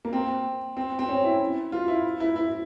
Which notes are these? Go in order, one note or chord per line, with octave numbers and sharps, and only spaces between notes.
A#3
C4
C4
C4
C#4
E4
F4
E4
E4
E4